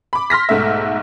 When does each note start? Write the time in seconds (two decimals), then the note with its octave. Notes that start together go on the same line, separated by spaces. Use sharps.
0.13 B5 D6
0.30 C6 F6 A#6 B6
0.49 B1 G#2 A3 E5